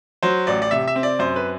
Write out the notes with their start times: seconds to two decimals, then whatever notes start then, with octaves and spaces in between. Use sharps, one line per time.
0.23 F#3 C5
0.47 A1 D5
0.62 D5
0.71 C3 E5
0.88 E5
0.96 C4
1.03 D5
1.19 F#2 C5
1.36 B4